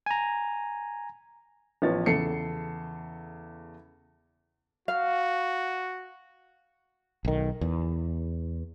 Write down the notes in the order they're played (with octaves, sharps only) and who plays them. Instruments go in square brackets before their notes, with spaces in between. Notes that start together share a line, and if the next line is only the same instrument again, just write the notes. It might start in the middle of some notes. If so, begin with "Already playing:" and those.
[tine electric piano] G#5 A#5
[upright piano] A1 F3 B3 C#5 A6
E2 C#3 A4 C7 C#7
[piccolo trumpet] F#4 [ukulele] F5
[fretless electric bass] B1 D#3
E2